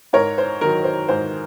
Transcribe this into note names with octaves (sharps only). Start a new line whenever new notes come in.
G#2 A#4 C#5
C5
D#3 F#3 A#4
C5
G#2 C5